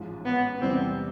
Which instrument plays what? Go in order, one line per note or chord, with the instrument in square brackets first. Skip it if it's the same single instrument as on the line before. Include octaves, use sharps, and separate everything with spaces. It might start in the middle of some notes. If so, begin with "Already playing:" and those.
Already playing: [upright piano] A1 G#2 F3 G#3
[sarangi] B3
[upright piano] E2 C3 E3 G3 B3 [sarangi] C4